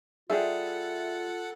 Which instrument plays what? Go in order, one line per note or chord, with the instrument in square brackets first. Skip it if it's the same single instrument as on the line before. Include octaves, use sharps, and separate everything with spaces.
[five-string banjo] G3 G#4 [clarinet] F4 [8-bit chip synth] A4 F#5 [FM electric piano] E5